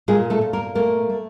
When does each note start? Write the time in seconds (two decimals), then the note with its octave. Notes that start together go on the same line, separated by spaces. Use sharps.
0.08 A#2 G#3 G#4
0.30 A3 A4
0.41 A#2
0.53 A#3 A#4
0.75 A3 A#3 A#4
1.10 A3